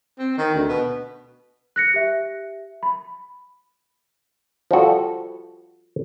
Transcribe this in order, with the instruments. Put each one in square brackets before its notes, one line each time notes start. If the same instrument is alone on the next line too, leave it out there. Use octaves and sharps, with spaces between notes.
[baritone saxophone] C4
D#3
D2
B2
[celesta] F#6 A#6 C#7
G4 E5
B5
[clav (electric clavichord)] F3 G3 F#4 A4